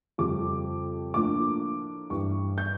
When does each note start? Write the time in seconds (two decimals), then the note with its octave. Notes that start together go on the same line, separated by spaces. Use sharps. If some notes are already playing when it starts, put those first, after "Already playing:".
0.18 F2 C#3 G3 D6
1.14 A2 F3 A#3 D4 D6
2.10 G2 E3 G3 C#6
2.58 G6